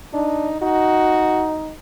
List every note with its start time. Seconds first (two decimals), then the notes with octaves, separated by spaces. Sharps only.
0.14 D4 D#4
0.61 D#4 F#4